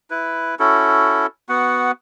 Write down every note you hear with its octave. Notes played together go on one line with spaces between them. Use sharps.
E4 B4
C#4 E4 F#4 A4
B3 F#4 F#5